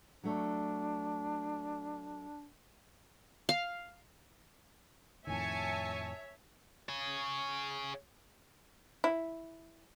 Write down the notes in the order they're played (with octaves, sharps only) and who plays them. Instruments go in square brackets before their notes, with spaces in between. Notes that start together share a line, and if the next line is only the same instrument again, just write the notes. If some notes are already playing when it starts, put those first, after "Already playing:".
[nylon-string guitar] F#3 A3 C#5 [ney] D4
[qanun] F5
[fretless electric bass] F2 A2 D#3 [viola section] C#5 E5 [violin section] G#5 A5 C#7
[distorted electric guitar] G#4 C#5
[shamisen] E4